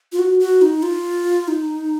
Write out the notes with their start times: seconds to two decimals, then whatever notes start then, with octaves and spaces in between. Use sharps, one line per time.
0.12 F4
0.19 F#4
0.40 F#4
0.62 D#4
0.83 F4
1.48 D#4